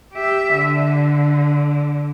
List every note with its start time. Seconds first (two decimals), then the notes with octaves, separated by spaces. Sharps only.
0.13 G4 E5
0.55 D3